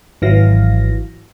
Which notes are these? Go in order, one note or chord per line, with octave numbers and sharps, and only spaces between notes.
G#1 E3 F#3 F5 A#6